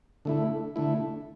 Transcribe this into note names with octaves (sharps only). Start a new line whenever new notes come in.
D3 A3 E4
D3 A3 E4